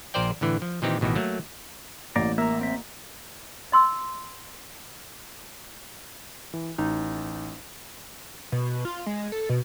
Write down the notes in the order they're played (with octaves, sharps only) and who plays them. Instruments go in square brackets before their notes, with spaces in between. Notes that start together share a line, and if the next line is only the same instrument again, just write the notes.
[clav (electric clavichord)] A#1 F4 A#4 C5 D5 G5
A2 D3 E3
F3
A#2 D#3 E3 C4 D#4 G4
A1 B2 D#3 E3 F#4
F#3 A3 A#3
[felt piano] A1 [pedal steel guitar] A#3 D5 A#5
[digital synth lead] A#3 [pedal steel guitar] E5 A#5
[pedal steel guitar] C4 E5
[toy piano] D#5 C6 E6
[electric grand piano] E3
[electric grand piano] A1 [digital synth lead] D#4
[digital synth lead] B2
F4
G#3
A4
B2